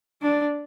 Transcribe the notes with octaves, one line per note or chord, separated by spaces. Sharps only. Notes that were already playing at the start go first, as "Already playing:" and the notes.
D4